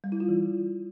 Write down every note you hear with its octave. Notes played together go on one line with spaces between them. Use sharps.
G3
E4
F4
E3